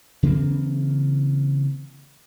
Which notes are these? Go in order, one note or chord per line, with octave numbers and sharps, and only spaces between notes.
C#3 E3 A#3 C4